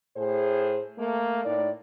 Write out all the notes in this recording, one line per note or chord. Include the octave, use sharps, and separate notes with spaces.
A2 G#4 C5
A3 A#3
A2 D#4 D5